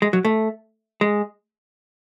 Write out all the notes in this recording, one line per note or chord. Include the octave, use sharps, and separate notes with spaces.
G#3
F#3
A3
G#3